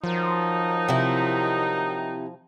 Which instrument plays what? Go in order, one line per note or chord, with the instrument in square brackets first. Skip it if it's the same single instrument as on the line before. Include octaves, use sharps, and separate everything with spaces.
[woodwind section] D#3 F#3 D#4 [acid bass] F3
[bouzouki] C3 E4